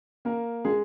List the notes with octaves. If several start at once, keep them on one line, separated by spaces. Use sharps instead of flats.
A#3 A#4
G#3 G#4